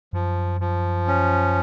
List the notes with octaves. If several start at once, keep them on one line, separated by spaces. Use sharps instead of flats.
F#2 F3
F3
C#4